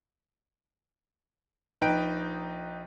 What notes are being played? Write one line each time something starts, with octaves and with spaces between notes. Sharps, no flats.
A#1 D#4 B4 G5 D7